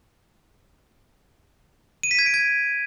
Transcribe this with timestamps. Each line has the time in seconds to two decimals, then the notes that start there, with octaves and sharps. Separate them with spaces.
2.03 D#7
2.11 B6
2.19 G#6
2.26 D7
2.34 G#6